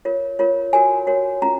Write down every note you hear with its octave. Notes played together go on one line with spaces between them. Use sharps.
F4 A#4 C#5
F4 A#4 C#5
F#4 A#4 C#5 G#5
F#4 A#4 C#5
C#4 F4 A#5